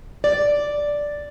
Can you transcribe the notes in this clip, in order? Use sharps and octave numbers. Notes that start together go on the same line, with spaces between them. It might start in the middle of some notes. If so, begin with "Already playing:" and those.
D5